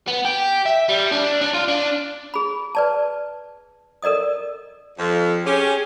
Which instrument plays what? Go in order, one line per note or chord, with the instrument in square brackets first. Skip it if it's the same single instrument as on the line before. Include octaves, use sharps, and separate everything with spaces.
[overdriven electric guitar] B3
G4
E5
G3
D4
D4
F4
D4
[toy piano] G#4 B5
B4 D5 A5
A4 A#4 D5 D#5 D#6
[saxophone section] F2
[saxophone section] C#4 G4 [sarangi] G#4